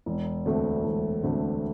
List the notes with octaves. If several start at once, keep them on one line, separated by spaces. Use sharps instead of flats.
E1
D2 D3 A3 C4
E1
D2 D3 A3 C4